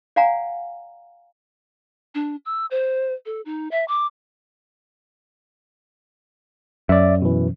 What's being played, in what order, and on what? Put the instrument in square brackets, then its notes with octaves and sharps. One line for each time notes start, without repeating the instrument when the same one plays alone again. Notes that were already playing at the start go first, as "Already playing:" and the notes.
[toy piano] D5 F5 F#5 G#5 A#5
[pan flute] D4
E6
C5
A4
D#4
E5
D6
[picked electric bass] F#2 [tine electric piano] D5 E5
[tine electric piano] B2 E3